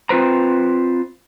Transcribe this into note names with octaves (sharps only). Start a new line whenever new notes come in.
C4 F4 B4 C5 A#5